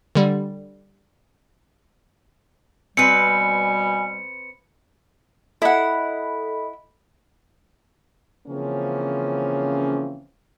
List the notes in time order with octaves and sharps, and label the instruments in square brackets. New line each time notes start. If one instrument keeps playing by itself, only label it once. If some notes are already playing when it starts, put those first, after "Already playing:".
[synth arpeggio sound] D3 G3
[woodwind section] B2 G3 [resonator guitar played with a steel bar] C4 B4 [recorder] G#5 [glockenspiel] C#7
[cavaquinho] E4 F#5 [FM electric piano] A4 D#5 B5
[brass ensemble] C#3 E3 F3 A#3 C4 C#4